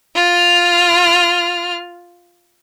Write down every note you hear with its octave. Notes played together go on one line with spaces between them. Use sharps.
F4 F6